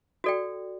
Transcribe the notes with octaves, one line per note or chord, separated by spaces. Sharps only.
F#4 A4 D5 G5